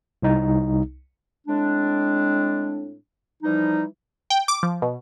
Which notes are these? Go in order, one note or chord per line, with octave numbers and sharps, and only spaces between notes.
C2 D#4
A2 G#3 C4 D4
E3 F3 G3 D#4
G5
D6
F3
B2